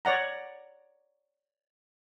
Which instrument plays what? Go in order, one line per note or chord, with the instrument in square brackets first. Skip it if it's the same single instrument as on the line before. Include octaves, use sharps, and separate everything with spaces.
[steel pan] C#5 D5 F#5 A#5